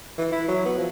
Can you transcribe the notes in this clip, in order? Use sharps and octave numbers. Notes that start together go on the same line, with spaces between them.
E3
E4
F#3
B3
F3